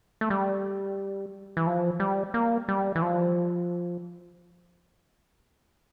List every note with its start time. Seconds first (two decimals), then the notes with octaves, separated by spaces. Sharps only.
0.21 A3
0.30 G3
1.57 E3
1.67 F3
2.00 G3
2.34 A#3
2.68 G3
2.96 E3
3.02 F3